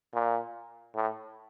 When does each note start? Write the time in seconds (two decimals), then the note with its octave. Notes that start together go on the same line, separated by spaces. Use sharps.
0.14 A#2
0.95 A2